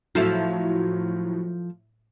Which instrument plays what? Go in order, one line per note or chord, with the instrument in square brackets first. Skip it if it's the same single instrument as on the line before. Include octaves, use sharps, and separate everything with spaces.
[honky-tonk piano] A2 F#3 [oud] F3 E4 A4